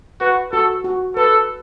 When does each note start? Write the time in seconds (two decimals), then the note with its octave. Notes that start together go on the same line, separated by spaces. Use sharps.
0.20 F#4 B4
0.52 F#4 A4
0.84 F#4
1.16 A4 B4